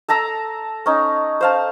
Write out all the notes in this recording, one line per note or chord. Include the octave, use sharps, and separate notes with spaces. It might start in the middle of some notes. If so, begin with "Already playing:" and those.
A4 A5 A#5 E6
C#4 D#4
C5 F5 A5